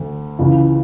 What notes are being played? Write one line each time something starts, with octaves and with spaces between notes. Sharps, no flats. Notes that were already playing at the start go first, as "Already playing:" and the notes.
Already playing: D2
C#2 C#3 E3